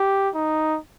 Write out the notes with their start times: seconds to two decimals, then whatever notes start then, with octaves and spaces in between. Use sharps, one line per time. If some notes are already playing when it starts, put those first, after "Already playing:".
Already playing: G4
0.35 D#4